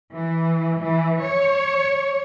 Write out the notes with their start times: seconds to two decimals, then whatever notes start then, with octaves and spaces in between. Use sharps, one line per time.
0.13 E3
0.81 E3
1.23 C#5